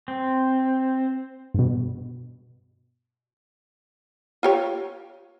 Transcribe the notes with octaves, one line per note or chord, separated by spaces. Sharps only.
C4
G2 B2
F4 G4 C#5